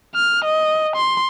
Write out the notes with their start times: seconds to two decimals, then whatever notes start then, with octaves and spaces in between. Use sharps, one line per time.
0.15 F6
0.45 D#5
0.96 C6